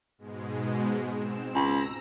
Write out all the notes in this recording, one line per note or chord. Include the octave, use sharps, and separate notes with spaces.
G#2 B2 G#3
C4 E7
C#2 A#5 E6 A#6